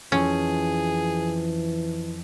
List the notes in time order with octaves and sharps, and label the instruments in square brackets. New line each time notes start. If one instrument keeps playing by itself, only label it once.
[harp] F2 [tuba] E3 [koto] C#4 [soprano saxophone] G#4